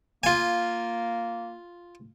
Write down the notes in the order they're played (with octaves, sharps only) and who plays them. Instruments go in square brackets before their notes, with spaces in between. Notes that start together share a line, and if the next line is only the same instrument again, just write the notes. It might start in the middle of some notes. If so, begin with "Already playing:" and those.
[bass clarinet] A#3 [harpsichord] F4 G#5